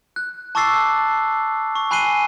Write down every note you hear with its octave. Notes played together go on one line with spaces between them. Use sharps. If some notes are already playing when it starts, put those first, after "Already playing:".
F#6
A5 C#6 D6 E6 A6 C7
C#6
G#5 B5 F#6 C7 D#7 G7